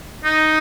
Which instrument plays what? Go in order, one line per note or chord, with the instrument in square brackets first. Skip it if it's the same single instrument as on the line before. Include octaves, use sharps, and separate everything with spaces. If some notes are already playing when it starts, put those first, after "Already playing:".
[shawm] D#4